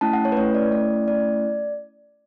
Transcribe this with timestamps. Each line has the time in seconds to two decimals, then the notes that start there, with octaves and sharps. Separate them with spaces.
0.01 A3 C#4 E4 A5
0.13 F#5
0.25 C#5
0.32 B4
0.37 A3 C#4 E4 C#5
0.55 D5
0.72 A3 C#4 E4 D5
1.08 A3 C#4 E4 D5